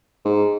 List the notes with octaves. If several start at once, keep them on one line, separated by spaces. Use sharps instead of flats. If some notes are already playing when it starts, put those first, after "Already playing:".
G#2